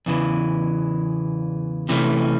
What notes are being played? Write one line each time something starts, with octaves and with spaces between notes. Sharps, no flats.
E2 C#3 E3
C3 E3 A3 C#4